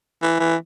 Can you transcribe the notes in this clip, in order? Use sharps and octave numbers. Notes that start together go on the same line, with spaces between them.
E3
E3